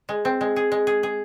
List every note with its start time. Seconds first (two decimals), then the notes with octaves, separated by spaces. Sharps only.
0.09 G#3
0.25 C4
0.41 G#3
0.56 G#4
0.72 G#3
0.87 G#4
1.03 G#4